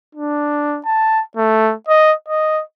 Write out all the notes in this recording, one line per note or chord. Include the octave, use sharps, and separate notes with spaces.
D4
A5
A3
D#5
D#5